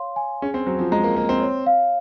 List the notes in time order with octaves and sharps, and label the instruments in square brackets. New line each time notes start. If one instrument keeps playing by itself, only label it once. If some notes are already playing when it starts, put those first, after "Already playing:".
Already playing: [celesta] C#5 F5 C6
G#5
[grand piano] C#4 [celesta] G#4
[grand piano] C4
[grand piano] F#3 [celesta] C5
[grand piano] F3
[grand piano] G#3 [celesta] A#5
[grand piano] A#3
[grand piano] A#3 [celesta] D#5
[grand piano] C4
[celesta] C#5
F5